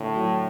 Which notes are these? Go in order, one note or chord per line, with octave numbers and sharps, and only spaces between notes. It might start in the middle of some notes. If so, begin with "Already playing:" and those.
Already playing: A2 D3 D4
F#3 F#4